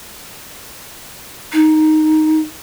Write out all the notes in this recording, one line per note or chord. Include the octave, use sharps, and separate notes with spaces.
D#4